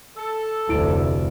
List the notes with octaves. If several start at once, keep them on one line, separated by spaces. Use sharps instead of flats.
A4
F1 D2 E4 D7